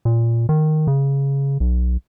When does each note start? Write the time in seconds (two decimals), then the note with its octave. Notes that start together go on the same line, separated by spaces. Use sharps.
0.05 A#2
0.49 D#3
0.87 C#3
1.60 B1